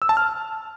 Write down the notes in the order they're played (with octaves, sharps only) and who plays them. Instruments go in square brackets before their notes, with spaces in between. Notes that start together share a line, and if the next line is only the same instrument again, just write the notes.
[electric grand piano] E6
A5
F6